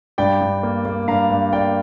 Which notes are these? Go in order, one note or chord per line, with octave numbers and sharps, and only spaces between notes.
G2 D5 G5
G2
A#3
A#3
G2 F5 A#5
G2
A#3 D5 G5